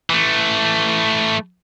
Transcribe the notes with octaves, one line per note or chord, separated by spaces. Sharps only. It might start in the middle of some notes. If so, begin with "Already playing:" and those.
E3 A3